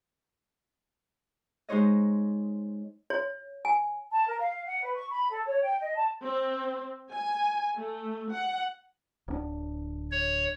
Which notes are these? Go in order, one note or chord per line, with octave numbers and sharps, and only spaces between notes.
G#3 D#4 C5 C#5 D#5
C#5
G#5
A5
A#4
F5
F#5
B4
C#6
B5
A4
C#5
G5
D#5
A5
C4
G#5
A3
F#5
D1 C4 D4
C#5